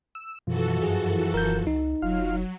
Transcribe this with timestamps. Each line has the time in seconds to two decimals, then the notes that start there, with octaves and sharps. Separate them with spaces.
0.15 E6
0.47 F#2 B2 E3 F3 F#4 A4
0.83 G2 G#4
1.34 E1 A#4 G6
1.67 C#2 D#4
2.02 F1 F#3 F4 F5